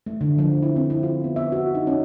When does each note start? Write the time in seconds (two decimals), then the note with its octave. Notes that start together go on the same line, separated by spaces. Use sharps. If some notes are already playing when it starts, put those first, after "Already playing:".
0.06 A3
0.21 D3
0.38 F3
0.63 E4
0.76 C4
0.90 E4
1.03 F4
1.24 B3
1.36 E5
1.52 F#4
1.75 D#4
1.87 C#4